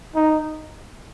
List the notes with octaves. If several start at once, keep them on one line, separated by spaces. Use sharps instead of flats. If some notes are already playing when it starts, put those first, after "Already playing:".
D#4